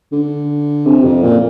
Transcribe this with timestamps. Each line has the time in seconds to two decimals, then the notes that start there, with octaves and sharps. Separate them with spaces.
0.12 D3
0.86 C3
1.04 F2
1.22 A#2